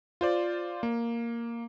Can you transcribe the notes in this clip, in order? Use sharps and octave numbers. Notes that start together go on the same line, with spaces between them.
F4 C5 D5
A#3